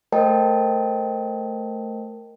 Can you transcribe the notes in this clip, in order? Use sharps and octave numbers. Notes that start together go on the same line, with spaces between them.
A3 A#4 C5 D#5 G5 A5